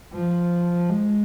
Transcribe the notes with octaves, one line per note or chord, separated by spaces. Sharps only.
F3
G#3